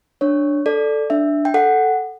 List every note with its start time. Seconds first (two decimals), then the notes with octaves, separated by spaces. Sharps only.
0.21 D4 C#5
0.66 A4 D5
1.10 D4 E5
1.45 G5
1.54 A4 F#5